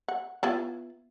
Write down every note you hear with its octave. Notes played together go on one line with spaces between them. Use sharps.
F#5
B3 E4 F4